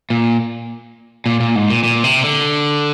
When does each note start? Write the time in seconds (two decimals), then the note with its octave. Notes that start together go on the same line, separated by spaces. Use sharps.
0.10 A#2
1.26 A#2
1.40 A#2
1.56 G#2
1.70 A#2
1.84 A#2
2.04 C3
2.23 D3